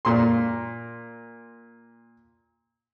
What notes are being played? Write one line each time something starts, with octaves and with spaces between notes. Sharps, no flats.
A#2 C6